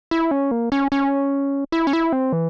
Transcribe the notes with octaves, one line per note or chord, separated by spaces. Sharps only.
E4
C#4
A#3
C#4
C#4
E4
C#4
E4
C4
E3